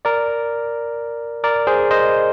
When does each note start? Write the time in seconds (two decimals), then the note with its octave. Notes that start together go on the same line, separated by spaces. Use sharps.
0.05 A#4 D5
1.44 A#4 D5
1.67 G#4 C5
1.91 C5 D#5